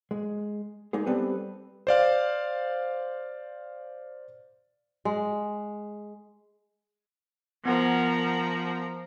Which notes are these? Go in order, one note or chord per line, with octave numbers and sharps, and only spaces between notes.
G#3
G#3 A#3 D#4 G#4
G3 B3 C4 A4 B4
C5 D5 F5
G#3
F3 B3 A#4 F#5 A#5